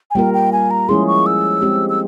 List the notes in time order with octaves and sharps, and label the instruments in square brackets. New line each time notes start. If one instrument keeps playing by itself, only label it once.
[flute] G#5
[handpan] G3 A#3 F4 A#4 [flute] G5
[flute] G5
G#5
A#5
[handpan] F3 G#3 C#4 E4 G#4 [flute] C6
[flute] C#6
E6
[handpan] G#3 C4 G4
[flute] E6